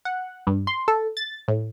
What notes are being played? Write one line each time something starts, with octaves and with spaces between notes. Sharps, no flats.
F#5
G2
C6
A4
A6
A2